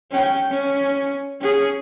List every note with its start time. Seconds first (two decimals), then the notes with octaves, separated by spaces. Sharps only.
0.11 C#4 G5
0.51 C#4
1.41 C#4 G#4